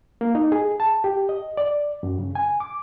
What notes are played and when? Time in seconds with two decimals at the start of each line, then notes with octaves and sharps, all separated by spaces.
0.21 A#3
0.35 D#4
0.52 G#4
0.80 A5
1.04 G4
1.29 D#5
1.57 D5
2.03 F#2
2.19 C#3
2.35 G#5
2.60 D6